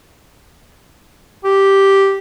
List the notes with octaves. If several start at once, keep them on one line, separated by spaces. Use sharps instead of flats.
G4